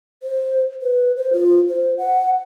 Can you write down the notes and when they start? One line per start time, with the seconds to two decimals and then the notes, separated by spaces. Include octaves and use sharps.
0.23 C5
0.82 B4
1.16 C5
1.33 F4
1.69 C5
1.98 F#5